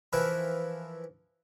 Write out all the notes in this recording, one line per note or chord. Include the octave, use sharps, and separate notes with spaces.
E3 F3 E4 A#4 B4